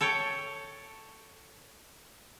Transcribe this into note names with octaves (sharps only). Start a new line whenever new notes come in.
A4 C#5 G5